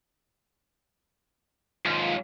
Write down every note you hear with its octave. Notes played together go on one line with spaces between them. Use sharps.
D#2 G#2 F4